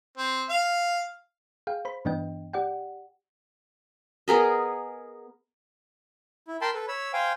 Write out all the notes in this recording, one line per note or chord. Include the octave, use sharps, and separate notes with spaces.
C4
F5
G#4 F5 G5
C5 B5
G2 E3 B3 D4 D#5 G5
G4 D5 F#5 G5
B3 G#4 A#4 D#5
E4
A#4 G5 A5 B5 C6
A4 B4
C#5 B5 E6
C5 F5 G5 G#5